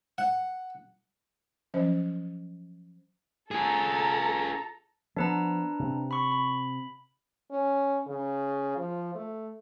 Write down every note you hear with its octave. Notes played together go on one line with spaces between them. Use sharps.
F#5
F3 F#3 C#4 C5 D#5 E5
F4 G#4 A4 A#5
F3 B3 D4 B4 A#5
C3
B5 C#6
B5
C#4
C#3
F3
A3